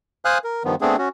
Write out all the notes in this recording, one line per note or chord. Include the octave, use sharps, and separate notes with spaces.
C5 F5 G#5 D#6 F6 F#6
A#4
G2 D#3 F3 B3
A3 B3 C4 D4 G#4
C#4 F#4